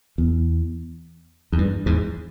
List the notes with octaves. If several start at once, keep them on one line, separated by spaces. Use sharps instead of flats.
E2
E2
G2
E2 G#2